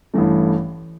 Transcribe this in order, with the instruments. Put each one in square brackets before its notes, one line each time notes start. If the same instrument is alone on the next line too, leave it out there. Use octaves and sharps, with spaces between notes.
[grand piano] A1 G2 E3 A3